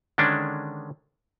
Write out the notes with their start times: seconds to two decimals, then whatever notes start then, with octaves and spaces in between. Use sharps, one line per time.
0.18 D3 D#3 G#3 C#4 D4